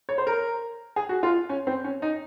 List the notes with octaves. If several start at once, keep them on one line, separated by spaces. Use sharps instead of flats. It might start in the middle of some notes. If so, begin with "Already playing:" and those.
C#5
C5
A#4
G#4
F#4
F4
C#4
C4
C#4
D#4